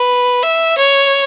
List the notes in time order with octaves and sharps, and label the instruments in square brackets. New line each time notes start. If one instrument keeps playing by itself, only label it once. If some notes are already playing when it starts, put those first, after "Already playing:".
Already playing: [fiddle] B4
E5
C#5